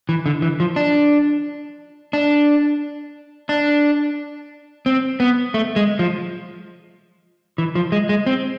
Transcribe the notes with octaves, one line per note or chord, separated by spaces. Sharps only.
E3
D3
E3
F3
D4
D4
D4
C4
B3
A3
G#3
F3
E3
F3
G#3
G#3
C4